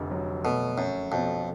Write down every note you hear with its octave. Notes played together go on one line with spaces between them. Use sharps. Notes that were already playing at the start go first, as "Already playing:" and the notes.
Already playing: F1 F2 D3
F#3
B2 A3
F#2 C#4
F2 B2